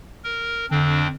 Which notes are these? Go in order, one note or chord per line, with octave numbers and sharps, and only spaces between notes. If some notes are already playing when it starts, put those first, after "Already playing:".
A#4
F2 D3 C4 D4